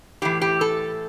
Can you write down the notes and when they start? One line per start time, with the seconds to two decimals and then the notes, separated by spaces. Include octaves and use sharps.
0.22 A2 E3 G4
0.41 G4
0.61 A4